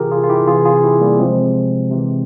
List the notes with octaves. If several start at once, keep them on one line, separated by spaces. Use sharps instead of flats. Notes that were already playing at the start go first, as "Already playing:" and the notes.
Already playing: C3 E3 F4 G4 G#4 A#4
F4 G#4
F4
E4 G4
C3 E3 F4 G#4
F4 G#4
E4 G4
G3 A#3
C3 F3 G#3 C4
C3 E3